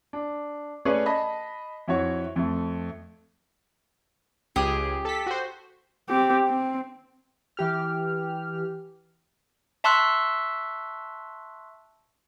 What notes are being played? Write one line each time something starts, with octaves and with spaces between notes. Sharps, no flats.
D4
A3 C#4 G#4 B4 C#5 D5
D#5 A5 B5
F2 E4 F#4 C#5
F2 A3
C#2 G4 G#4 D#6
A4 B6
F#4 C5
C4 G4
C4
E3 G4 F6
E5 A5 C6 C#6 E6 F#6